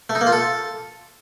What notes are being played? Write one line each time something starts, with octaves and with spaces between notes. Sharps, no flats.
A3
D#4
A#3
F4
A4